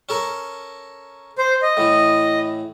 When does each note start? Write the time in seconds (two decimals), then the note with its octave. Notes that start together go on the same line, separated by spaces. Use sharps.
0.09 C#4 A4 A#4
1.38 C5
1.62 D#5
1.77 A2 E3